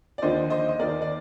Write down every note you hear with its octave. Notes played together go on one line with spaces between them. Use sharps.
D5
D#2 D3 F3 C5 D#5
C5 D#5
D#5
D#2 D#3 A#4 D5
D5